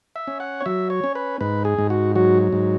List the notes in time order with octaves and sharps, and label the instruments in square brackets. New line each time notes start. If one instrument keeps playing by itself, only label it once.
[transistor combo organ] E5
C#4
F#5
C#5
F#3 E5
C#5
C#4
B4
G#2 B4
G#4
G#2
F#4
F#3 F#4
G#2